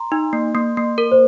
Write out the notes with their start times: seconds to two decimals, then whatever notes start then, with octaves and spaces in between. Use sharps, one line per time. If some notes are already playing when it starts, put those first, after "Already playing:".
Already playing: A#5 C6
0.12 D#4
0.33 A#3
0.55 A#3
0.77 A#3
0.98 A#4
1.12 C5